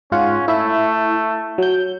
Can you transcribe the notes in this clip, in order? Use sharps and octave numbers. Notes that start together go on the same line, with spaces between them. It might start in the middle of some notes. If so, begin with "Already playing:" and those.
G#2 C#4 F4 F#5
A3 E4 E5
F#3 G6